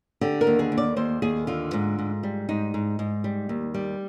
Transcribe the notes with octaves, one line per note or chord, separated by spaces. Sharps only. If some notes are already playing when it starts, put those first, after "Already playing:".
D3 G4
A#4
D#2
G#4
D#2
D5
D#2 C5
D#2 G#4
D3 F4
G#2
G#2
G3
G#2 D#4
G#2
G#2
G3
D#2
G3